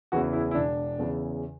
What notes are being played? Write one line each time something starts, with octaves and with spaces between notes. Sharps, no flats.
E2 C#3 E3 F#4
E4
E4
E1 D4
E2 C#3 E3